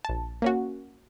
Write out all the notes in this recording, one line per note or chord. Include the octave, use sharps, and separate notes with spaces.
A#1 A5
A#3 C#4 F#4